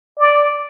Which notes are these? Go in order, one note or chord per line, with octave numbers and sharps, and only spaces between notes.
D5